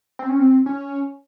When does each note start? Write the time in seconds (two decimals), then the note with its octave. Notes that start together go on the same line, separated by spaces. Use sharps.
0.19 C4
0.29 C#4
0.39 C4
0.66 C#4